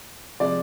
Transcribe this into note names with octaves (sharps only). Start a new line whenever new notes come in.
C3 F3 G#3 D5